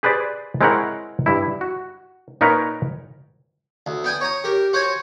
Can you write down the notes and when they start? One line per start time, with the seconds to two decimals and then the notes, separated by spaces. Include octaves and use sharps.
0.03 G4 G#4 B4 C5 D5
0.61 G#3 C4 E4 A#4 C#5 F#5
1.26 G2 E4
1.61 F#4
2.41 A#2 D#4 F4 A#4 B4 C#5
3.86 D2
4.04 B3 G5 G#5
4.21 C#5 A#5 D#6
4.44 G4 A#4
4.73 F#4 C5 C#5 G#5